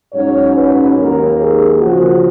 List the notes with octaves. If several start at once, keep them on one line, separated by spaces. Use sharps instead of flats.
G#2 F#3 C#4 C#5
B4
D#2 D#3 A#3 A#4
G#4
C#3 F3 A#3 F#4